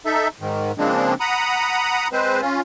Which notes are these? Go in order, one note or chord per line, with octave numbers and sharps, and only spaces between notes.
D#4 A4 E5
G#2 D#3
C#3 F3 G#3 A#3 C4 D4
F#5 A#5 B5 D#6
G#3 C4 B4 C5
C#4 F4